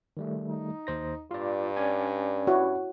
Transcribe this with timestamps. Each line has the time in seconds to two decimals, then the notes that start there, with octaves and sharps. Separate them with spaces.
0.17 D#3 G3 A3
0.49 D#4
0.87 D#2 C5 A#6
1.31 G2 F4 D5
1.77 C#4 D5 G#5
2.47 E4 F#4 C#5